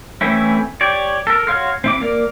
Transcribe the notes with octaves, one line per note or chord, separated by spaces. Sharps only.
E3 A3 C4 C#4 E4
G4 C#5 D5
A4 A#4
F#4 C#5 F5 C6 F6
C4 E4 D6
A#3 A#4 D5